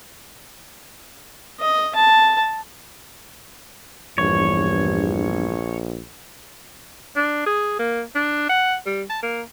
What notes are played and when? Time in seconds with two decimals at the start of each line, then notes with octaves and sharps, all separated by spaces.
1.60 D#5
1.95 A5
4.18 A#1 E2 G2 C#5
7.16 D4
7.46 G#4
7.79 A#3
8.15 D4
8.49 F#5
8.86 G3
9.10 A5
9.23 A#3